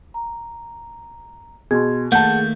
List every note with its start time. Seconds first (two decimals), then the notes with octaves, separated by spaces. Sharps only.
0.14 A#5
1.71 B2 G#4 C6 G#6
2.12 D#2 A3 A#3 F#5 A5 G6